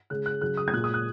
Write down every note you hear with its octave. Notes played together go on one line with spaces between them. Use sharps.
C#3 G#3 F#6
F#6
C#3 F#3 F#6
D#6
G#6
A#2 G#3 F#6
D#6
F#6